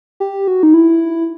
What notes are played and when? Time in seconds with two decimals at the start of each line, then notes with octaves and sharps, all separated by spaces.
0.20 G4
0.48 F#4
0.63 D#4
0.74 E4